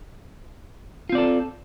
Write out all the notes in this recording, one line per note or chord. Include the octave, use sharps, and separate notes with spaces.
C4 F4 A4 D5